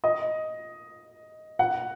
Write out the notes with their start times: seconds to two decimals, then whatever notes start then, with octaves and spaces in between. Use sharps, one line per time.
0.04 D#5
1.59 F#5